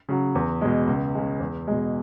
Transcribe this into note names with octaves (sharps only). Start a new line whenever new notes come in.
C#3 F#3
E2
B2 G#3
C#2
C#3 G#3
E2
B2 G#3